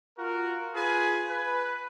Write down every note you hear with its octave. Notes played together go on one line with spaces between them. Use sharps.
F4 F#4 A#4
F4 G#4 B4 G#5
B4